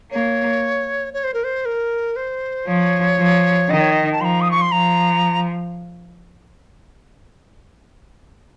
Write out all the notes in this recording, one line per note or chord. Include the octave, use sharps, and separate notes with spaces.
A#3 C#5
C#5
C5
A#4
C5
A#4
C5
F3 C#5
F3
D#3 D#5
C#5
D#5
A5
F3 A#5 C6
D#6
C#6
C6
F3 A#5